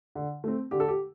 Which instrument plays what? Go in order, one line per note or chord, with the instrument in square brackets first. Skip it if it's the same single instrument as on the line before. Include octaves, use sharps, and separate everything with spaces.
[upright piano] D3
A3 C4
D3 G4
A4
G4